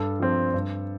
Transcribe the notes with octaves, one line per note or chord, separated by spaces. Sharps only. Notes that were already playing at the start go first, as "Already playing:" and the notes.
Already playing: G2 A4
F3 C4
G2